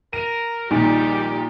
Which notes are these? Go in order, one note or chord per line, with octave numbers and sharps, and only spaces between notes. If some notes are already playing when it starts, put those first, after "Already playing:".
A#4 D#7
A#1 A#2 D#3 G3 D#4 G4